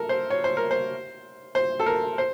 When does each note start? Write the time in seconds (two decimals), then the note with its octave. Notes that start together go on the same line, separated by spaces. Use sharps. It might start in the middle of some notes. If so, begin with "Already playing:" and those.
Already playing: A4 A#4
0.09 C5
0.30 C#5
0.44 C5
0.57 A#4
0.71 C5
1.55 C5
1.80 A4
1.86 A#4
2.18 C5